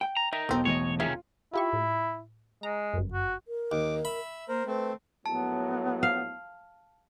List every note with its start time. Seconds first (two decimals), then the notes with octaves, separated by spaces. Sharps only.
0.01 G5
0.17 A#5
0.33 D#4 A#4 E5
0.49 E1 B1 B2 C4 A4
0.65 A2 E3 C#5 D#5
1.00 C3 D#3 C#4 F4 G#4 E5
1.53 E4 F4 G4 C#6
1.73 A2
2.63 G#3 A#5
2.94 G1 F#2
3.13 F#4
3.48 A#4
3.72 D#2 D6
4.05 E5 B5
4.48 A#3 A#4 C5
4.66 A3 C4 B4
5.26 A#1 A2 F#3 B3 A5
6.03 F5